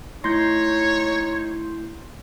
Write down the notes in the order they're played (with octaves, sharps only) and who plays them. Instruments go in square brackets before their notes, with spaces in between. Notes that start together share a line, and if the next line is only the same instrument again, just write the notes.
[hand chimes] A3 E4 A#6 [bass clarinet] D#4 [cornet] C#5 [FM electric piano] C6 G6